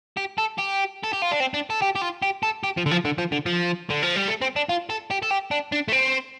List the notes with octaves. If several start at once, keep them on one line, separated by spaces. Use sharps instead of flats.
G4
A4
G4
A4
G4
F4
D4
C4
D4
A4
G4
G4
F4
G4
A4
G4
F3
D3
F3
D3
F3
D3
F3
D3
F3
G3
A3
C4
D4
F4
A4
G4
A4
G4
D4
D4
A3
C4